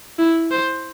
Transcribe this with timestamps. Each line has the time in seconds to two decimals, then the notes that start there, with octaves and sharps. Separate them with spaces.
0.19 E4
0.51 C5